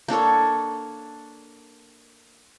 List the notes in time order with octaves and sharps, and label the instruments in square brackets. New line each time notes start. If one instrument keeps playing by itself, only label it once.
[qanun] A#3 D4 A4 C#5